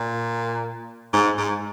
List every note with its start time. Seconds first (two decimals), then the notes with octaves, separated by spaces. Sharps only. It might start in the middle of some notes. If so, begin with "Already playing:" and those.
Already playing: A#2
1.13 G#2
1.38 G#2